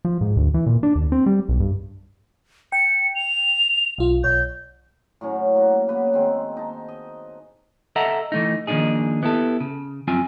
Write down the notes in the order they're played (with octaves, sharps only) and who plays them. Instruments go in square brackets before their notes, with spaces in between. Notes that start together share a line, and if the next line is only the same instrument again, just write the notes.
[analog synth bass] F3
G#2
D2
E3
A#2
D4
D#2
C4
G3
B1
G2
[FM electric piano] G5 [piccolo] C#7
[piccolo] F7
[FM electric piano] B1 F4
[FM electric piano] B1 C#5 [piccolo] G6
[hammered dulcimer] A2 F#3 C#4
A#3 F#4
A#3 B3 B4 C#5
D#3 G#3 C4
D#4 A5
D#5
[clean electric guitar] A4 D#5 E5 F#5 A5 A#5
E3 A3 D#4
D#3 F3 A#3 D4 D#4 G#4
B3 E4 G4 A4
C#3
F#2 F3 C4 F4 G#5